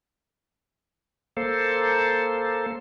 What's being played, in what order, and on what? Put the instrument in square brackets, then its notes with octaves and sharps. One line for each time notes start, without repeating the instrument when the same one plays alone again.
[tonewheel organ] A#3 A4 C5